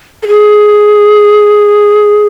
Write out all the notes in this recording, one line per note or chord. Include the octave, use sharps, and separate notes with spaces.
A4
G#4